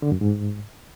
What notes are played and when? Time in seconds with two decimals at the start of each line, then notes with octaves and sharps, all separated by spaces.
0.02 D3
0.12 F#2
0.21 G#2